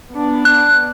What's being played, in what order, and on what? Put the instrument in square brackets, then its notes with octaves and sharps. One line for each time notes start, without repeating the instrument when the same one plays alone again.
[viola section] B3 D4
[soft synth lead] F#6